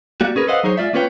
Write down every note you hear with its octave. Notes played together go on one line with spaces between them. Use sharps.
G3 A#3 F#4
C#4 G#4 A#4 B4
A4 B4 C5 D#5 F5 F#5
F#3 D#4 G#4 C5 C#5
G#3 F4 D5 E5
A#3 C#4 F4 B4 C#5 G5